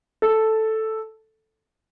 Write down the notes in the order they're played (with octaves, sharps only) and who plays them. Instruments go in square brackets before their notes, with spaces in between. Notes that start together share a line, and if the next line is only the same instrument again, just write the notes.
[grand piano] A4